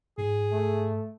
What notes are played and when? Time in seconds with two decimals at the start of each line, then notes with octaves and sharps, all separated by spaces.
0.18 G#2 G#4
0.52 A3